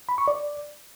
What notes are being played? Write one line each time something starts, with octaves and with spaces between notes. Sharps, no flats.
B5
C#6
D5